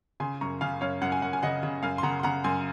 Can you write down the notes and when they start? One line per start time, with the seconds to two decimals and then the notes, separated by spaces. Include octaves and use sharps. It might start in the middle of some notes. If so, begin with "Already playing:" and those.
0.20 C#3 G#5 C6
0.41 F#2 A#5 C#6
0.61 C#3 F5 G#5
0.81 F#2 C#5 F5
1.01 F#2 F#5
1.12 G#5
1.22 F#2 F#5
1.33 G#5
1.43 C#3 D#5 F#5
1.63 C#3
1.83 F#2 F5 G#5
1.98 C6
2.03 C#3 F#5 A#5
2.19 C6
2.23 C#3 F#5 A#5
2.44 F#2 G#5 C6